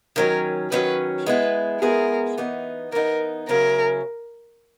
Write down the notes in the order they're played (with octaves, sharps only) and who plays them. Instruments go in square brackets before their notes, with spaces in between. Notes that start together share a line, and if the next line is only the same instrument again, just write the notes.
[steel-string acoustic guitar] D#3 F#3 C#4 [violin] A#4
[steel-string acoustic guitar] D#3 F#3 C#4 [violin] B4
[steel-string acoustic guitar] G#3 B3 E4 G#4 [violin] B4
[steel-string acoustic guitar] G#3 B3 E4 G#4 [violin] A#4
[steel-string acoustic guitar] E3 B3 D#4
[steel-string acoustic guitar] E3 B3 D#4 [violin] A#4
[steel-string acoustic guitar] C#3 F#3 C#4 E4 [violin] A#4